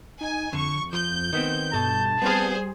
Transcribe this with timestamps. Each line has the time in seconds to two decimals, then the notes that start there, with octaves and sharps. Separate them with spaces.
0.21 D#4 G#5
0.53 F2 D3 C#6
0.93 F3 G6
1.33 D#3 B3 C4
1.73 G2 B2 A4 A5
2.22 G3 B3 C4 G#4 C5 F5